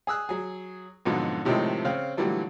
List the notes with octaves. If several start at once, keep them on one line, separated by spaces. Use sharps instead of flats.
G#4 D#6 E6 F#6
F#3 G#4
F2 G#2 B2 D3 F#3
A2 C3 D#3 F3 G#3 A3
C#3 C4 F5
A#2 D3 E3 F#3 G3 A3